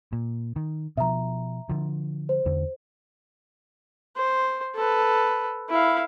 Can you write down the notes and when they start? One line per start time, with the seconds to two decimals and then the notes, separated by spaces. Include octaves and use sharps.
0.13 A#2
0.56 D#3
0.97 B2 F3 E5 A#5
1.69 D3 F3
2.29 C5
2.46 E2 D3
4.17 C5
4.75 A4 B4
5.69 E4 F5